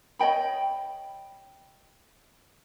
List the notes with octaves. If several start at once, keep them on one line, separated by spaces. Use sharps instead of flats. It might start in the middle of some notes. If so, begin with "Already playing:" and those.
C#5 D#5 G5 B5